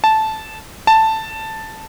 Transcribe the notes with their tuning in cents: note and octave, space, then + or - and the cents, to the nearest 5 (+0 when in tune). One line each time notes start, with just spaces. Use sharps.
A5 -10
A5 +5